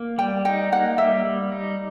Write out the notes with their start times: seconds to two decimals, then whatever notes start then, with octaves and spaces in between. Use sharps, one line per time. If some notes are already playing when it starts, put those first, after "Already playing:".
Already playing: A#3
0.18 G3 G5
0.45 D#4 G5
0.72 A#3 F#5
0.98 G3 E5
1.25 G3
1.52 D#4